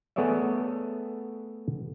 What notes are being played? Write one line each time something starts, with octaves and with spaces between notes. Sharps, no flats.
A3 B3 G#4 C#5 D5 E5